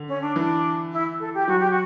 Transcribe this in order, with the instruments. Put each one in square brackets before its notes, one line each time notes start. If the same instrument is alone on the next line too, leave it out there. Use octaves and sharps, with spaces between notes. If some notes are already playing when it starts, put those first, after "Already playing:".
Already playing: [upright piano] D3
[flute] C#4
D4
[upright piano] E3 [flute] D4
[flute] E4
A4
G4
[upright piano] F#3 [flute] F#4
[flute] G4
F#4